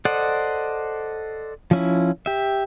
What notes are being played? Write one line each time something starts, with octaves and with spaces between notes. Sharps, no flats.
A4 C5 D5 D#5 F#5
F3 C#4 E4
G4 E5